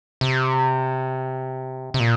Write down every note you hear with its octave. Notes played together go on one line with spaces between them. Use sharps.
C3
C3
A#2